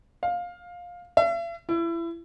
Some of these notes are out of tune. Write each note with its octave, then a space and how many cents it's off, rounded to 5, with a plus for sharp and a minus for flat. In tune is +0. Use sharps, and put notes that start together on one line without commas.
F5 +15
E5 +45
E4 +30